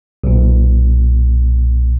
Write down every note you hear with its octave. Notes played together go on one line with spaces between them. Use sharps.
B1 A#2